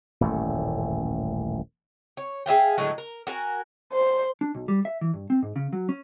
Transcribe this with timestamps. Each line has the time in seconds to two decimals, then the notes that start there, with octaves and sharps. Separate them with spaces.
0.21 D#1 A1 F#2 A3
2.17 C#5
2.46 G#4 E5 F5 G5
2.78 A2 D3 F#3 G#3
2.98 A#4
3.27 F#4 A#4 G#5
3.93 C5
4.41 D4
4.55 B1
4.68 G3
4.85 E5
5.01 E3
5.14 G2
5.30 C4
5.42 G#2
5.56 C#3
5.73 F#3
5.89 C#4